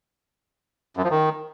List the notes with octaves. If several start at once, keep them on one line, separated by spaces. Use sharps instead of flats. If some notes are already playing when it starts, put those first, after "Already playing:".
F#2
F3
D#3